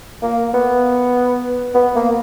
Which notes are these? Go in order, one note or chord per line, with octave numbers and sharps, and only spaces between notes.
A#3
B3
B3
A#3